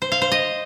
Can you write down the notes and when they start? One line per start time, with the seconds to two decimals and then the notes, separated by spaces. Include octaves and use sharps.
0.02 C5
0.12 F5
0.22 C5
0.32 D#5